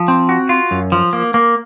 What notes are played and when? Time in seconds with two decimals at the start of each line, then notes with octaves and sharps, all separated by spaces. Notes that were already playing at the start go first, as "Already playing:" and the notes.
Already playing: F3
0.08 C4
0.29 F#4
0.49 F4
0.71 F#2
0.92 F3
1.13 A#3
1.34 A#3